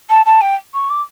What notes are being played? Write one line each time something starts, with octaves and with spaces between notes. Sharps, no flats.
A5
A5
G5
C#6
D6